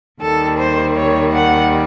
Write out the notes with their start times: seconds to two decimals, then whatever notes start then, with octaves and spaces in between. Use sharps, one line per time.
0.21 D#2 D#3 G3 A4
0.59 C5
0.97 C#5
1.34 F#5